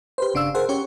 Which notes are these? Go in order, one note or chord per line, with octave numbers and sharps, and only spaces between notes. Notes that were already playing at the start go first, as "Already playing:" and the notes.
G4 B4 C5
G1 C#3 D4 F5 E6
G#4 A#4 C5 F#5
C#4 G4 C#5